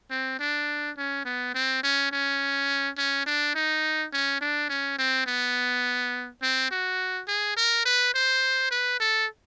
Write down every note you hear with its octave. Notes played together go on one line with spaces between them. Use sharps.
C4
D4
C#4
B3
C4
C#4
C#4
C#4
D4
D#4
C#4
D4
C#4
C4
B3
C4
F#4
G#4
A#4
B4
C5
B4
A4